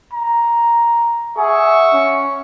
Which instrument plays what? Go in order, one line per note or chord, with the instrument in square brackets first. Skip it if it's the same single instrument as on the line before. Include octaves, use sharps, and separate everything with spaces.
[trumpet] A#5
[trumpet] G#4 [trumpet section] E5 F#5 C#6
[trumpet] C#4